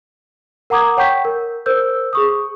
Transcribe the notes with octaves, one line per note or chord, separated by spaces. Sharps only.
A#4 F#5 A#5 D6 D#6 G#6
C#5 F#5 G5 C#6 G6 B6
A#4
A#4 C5 E6 G6
G#4 C#6 D#6